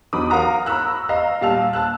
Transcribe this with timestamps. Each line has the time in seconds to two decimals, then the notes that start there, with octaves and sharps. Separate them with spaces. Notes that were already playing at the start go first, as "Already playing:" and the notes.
0.13 E2 F#3 D#4 B5 D6 D#6
0.30 A#4 F5 F#5 A#5 D#6
0.66 A#5 B5 C#6 E6 F#6
1.09 D#5 F5 A#5 E6
1.41 A#2 G3 F5 A5 E6 F7
1.73 A5 E6 F#6